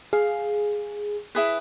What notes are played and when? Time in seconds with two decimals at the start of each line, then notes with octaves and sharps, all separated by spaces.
0.13 G#4 F5
1.35 E4 G#4 B4